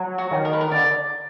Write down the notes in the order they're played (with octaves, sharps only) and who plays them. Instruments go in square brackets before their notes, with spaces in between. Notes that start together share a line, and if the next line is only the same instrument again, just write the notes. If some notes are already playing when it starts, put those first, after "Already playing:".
Already playing: [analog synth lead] F#3
[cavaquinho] F#4
[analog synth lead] D#3
[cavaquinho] A#4
B4
A#4
[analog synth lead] D3 [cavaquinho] D5